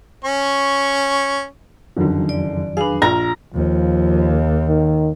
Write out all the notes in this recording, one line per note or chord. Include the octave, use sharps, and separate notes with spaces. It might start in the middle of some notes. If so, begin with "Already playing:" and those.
C#4 C#6
F#1 F2 D3 D#3 F#3
D5
D4 G#4 B4 F5
A#1 F4 A#5
D#2 F3
D#3